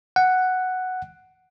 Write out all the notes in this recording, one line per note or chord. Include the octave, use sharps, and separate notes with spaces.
F#5